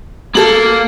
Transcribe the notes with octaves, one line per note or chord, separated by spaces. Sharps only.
A#3 A4 A#5 F#7